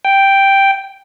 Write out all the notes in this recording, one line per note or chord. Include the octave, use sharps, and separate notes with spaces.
G5